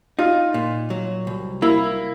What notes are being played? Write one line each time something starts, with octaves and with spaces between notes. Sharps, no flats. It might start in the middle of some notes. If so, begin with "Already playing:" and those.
D#4 F4
A#2
F#3
C2
A#3 E4